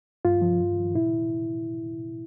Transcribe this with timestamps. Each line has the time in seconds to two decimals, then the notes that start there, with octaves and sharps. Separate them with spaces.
0.25 G2 F4
0.42 F3
0.60 G2
0.77 F3
0.95 A#2 E4